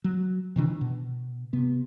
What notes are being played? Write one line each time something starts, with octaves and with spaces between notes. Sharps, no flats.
F#3
C3 D#3 E3 D4
B2
C3 B3